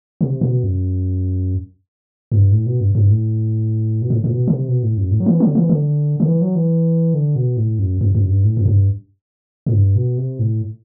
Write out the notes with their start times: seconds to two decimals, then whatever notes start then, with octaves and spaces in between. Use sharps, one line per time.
0.21 C3
0.41 B2
0.64 F#2
2.32 F#2
2.37 G2
2.51 A2
2.66 B2
2.80 G2
2.95 G2
3.09 A2
4.02 B2
4.10 A2
4.24 A2
4.32 B2
4.47 D3
4.54 C3
4.68 B2
4.83 A2
4.97 F#2
5.11 A2
5.20 F#3
5.26 E3
5.40 F#3
5.47 D3
5.55 E3
5.69 D3
6.20 D3
6.27 E3
6.41 F#3
6.56 E3
7.14 D3
7.36 B2
7.57 A2
7.79 F#2
8.01 F#2
8.15 F#2
8.29 G2
8.44 A2
8.57 F#2
8.65 G2
9.66 A2
9.74 G2
9.95 B2
10.17 C3
10.39 A2